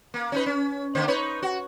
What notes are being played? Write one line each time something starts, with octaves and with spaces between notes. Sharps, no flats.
A#3
C#4 D#4 B4
C#4
D3 A#3 C5
D#4 B4 C#5
F#4